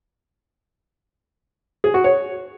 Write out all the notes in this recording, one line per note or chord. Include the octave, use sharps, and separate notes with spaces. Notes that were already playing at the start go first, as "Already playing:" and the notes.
G#4
F#4
C#5